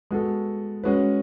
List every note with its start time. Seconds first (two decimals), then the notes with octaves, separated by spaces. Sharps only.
0.11 G#3 B3 F#4 A4
0.84 G#3 C#4 F#4 B4